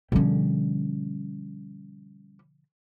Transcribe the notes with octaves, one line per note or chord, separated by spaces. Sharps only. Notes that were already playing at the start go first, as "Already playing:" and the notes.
B2 D3 F3 G3 C#4